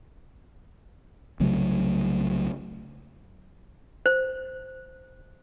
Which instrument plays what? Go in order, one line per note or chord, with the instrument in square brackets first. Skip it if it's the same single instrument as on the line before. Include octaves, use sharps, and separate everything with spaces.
[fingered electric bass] C2 C#3 F#3 A3
[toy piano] C5